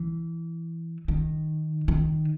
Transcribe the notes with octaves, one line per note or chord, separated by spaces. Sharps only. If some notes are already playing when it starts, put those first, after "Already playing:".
Already playing: E3
D#3
D#3